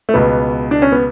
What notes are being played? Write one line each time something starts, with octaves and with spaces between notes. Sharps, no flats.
A3
C#2 B2 B3
D4
C#4
B3